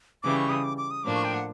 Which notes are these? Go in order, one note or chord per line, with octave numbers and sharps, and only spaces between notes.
C#3 E3 G3 D6
C#6
D#6
D6
D6
D#6
A2 F3 A#3 D4 D6
C#6
G5
F#5